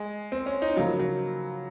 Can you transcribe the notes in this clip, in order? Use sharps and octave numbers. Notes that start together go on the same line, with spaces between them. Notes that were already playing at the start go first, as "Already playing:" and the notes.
Already playing: G#3
C4
C#4
D#4
C#3 F3 F#3 A#3 F4
F#3